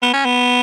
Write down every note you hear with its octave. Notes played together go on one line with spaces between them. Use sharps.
B3
C#4
B3